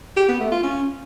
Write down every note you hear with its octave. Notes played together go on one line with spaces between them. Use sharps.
G4
B3
A3
F4
C#4